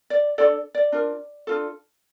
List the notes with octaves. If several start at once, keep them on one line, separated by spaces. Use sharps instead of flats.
D5
D4 F4 A4 D5
D5
D4 F4 A#4
D4 F4 A4